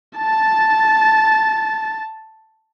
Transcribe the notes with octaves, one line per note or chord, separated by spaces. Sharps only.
A5 A6